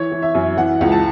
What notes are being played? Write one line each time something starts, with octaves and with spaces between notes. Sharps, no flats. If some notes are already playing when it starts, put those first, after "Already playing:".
Already playing: E3 C#5
E3
E5
F#2
E3 F#5
C#2
A5